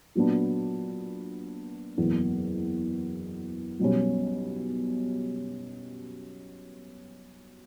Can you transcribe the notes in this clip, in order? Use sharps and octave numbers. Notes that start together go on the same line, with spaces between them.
A#2 F#3 B3 D4
F#1 E2 B2
B1 B2 G3 C#4